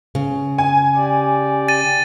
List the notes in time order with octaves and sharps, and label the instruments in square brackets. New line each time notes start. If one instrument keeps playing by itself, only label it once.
[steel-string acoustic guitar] C#3
[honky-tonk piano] G#5
[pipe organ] G4 D5
[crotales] A6 D#7